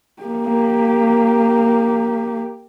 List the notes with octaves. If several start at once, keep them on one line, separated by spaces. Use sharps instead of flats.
A#3 G4